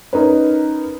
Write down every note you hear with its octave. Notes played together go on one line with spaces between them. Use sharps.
C#4 D#4 A#4 B4